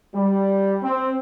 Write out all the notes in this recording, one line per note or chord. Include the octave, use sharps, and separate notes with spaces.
G3
C4